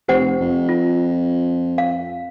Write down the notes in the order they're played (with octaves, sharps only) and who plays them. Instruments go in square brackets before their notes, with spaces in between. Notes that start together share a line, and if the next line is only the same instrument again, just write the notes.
[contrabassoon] F1 [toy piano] G4 C5 F#5
[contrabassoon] F2
[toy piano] F4
F5